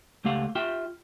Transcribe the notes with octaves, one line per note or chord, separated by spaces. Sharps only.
C#2 A3 G4 F5 F#5
F4 G4 E5 G5